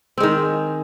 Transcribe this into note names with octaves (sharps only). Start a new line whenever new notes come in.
D#3 G#3 C4